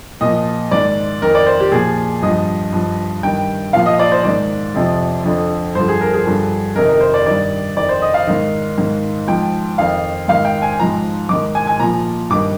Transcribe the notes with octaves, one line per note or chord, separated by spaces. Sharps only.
A#2 F3 D#5
G#2 D#3 D5
F2 D#3 A#4
D5
C5
G4
A#2 F3 G#4
G2 F3 D#5
G2 F3
G2 D#3 G5
A#2 F3 F5
D#5
D5
C5
G#2 D#3 D5
F2 C3 F3
F2 D3 F3
G2 D3 F3 C5
G#4
A#4
G#4
G2 D3 F3
F2 C3 D#3 A#4
A#4
C5
D5
G2 D#3 D5
F2 D#3 D5
C5
D#5
F5
G#2 D#3
G#2 D#3
G#2 F3 G5
F2 D#3 F5
G#2 D#3 F5
G5
G#5
G#2 F3 A#5
G#2 D#3 D6
G#5
G#5
A#2 F3 A#5
G2 D#3 D6